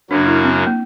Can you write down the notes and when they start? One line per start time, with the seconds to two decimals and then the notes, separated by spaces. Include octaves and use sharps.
0.10 F#2 C#3 F#3 A#3 C#4 D4
0.27 E4
0.44 C4
0.67 A#3